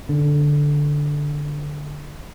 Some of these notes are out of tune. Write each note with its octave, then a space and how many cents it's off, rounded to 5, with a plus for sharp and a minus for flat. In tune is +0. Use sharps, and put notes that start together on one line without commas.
D3 -5